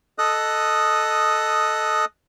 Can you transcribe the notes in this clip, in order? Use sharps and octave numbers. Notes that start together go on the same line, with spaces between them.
A4 D#5 D#6 F#6